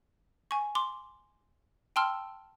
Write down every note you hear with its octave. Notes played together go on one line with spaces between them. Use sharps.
G#5 C#6
C6 D6
G5 A5 C6 E6 F6